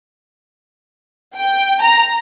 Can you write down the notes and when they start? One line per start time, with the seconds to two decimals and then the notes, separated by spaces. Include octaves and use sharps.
1.36 G5
1.83 A#5